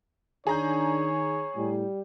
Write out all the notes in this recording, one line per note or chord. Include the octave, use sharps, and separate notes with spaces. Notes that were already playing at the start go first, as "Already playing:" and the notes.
D#3 D4 G#4 C#5 A#5 G6
A2 G3